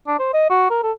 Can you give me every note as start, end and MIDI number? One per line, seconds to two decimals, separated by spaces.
0.07 0.18 62
0.19 0.32 72
0.33 0.45 75
0.50 0.70 66
0.70 0.82 70
0.83 0.92 69